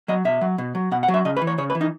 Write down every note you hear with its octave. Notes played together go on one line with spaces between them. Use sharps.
F#3 D#5
B2 E5
F#3
B2
F#3
B2 F#5
F#5
F#3
E5
C#3 D#5
B4
E3
C#5
C#3 C#5
B4
E3
D#4